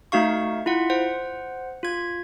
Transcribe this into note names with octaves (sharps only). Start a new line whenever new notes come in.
A3 D#4 F#4 F5 C#6
E4 F4 F#5
C5 F#5
F4 G#6